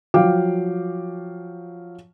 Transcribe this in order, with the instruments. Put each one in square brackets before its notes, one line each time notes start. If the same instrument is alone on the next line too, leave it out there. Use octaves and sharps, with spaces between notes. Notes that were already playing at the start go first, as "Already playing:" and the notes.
[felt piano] F3 F#3 F5 G5 D6